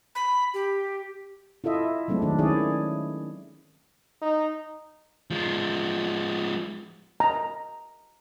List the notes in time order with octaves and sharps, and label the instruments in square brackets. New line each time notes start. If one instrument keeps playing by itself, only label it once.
[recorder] B5
G4
[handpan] E4 F4 A4 D#5 E5
F#3 G#3 A3 C4 D4
D#3 D4
D#3 C#4 E4 G#4 C#5 D5
[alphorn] D#4
[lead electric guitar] F3 G#3
[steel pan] A#5